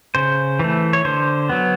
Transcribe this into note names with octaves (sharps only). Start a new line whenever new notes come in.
C#3 C5
E3 A3
C#5
D3 C5
F#3 B3